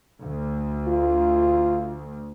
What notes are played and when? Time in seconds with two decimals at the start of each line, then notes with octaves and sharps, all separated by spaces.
0.20 D2
0.88 F4